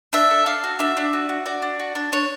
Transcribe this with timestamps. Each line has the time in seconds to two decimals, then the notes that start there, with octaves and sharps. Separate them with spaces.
0.13 D4 E5
0.30 A4
0.46 D4 F5
0.64 F#4
0.79 D4 E5
0.97 D4
1.13 F#4
1.29 F#4
1.46 F#4 D5
1.62 D4
1.80 F#4
1.95 D4
2.12 D4 C#5